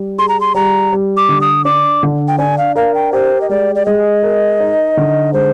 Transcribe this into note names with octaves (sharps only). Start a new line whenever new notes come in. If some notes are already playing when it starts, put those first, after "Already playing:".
Already playing: G3
G#4 C6
A#5
C6
G3 A#5
G3
D6
D3
D#6
D4 D6
D3
G5
D4 G#5
F5
A#4 F5
G5
G4 C5
D#5
G#3 D5
D5
G#3 D#5
A#4
D#4
D3
G#3 C5